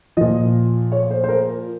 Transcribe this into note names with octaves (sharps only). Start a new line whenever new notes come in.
A#2 F3 D#5
C#5
C5
C5
A#4